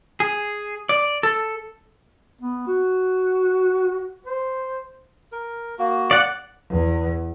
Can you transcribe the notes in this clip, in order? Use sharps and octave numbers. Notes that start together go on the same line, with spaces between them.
G#4
D5
A4
B3
F#4
C5
A#4
A#3 F#4
D5 F#5
E2